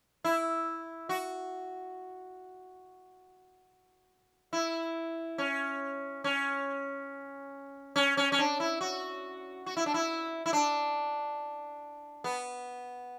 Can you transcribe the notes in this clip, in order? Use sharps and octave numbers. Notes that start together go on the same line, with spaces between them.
E4
F#4
E4
C#4
C#4
C#4
C#4
C#4
D4
E4
F#4
F#4
E4
D4
E4
E4
D4
B3